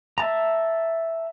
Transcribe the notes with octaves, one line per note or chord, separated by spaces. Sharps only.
E5 A5 A#5